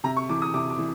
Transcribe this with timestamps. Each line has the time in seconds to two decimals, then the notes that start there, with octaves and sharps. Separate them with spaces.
0.04 C3 A#5
0.17 C#6
0.29 E3 D6
0.42 D#6
0.54 C3 D6
0.70 D6
0.78 E3